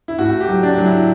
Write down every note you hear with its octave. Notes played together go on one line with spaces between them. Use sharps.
E4
A2 F#4
G4
F#3
D4
F#3
E4